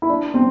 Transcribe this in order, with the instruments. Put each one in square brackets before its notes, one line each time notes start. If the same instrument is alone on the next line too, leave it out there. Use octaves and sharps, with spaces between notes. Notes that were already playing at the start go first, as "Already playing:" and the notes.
[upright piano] E4
D4
C4